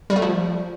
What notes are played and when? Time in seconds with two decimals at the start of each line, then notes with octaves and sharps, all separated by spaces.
0.10 G3
0.16 A3
0.22 F3